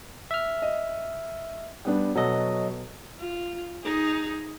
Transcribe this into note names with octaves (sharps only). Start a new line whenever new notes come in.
E5 F6
D#5
G3 B3 D4
B2 F#3 A4 D#5
F4
D#4 G#4